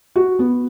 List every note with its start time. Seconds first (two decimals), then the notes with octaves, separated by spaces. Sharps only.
0.16 F#4
0.39 B3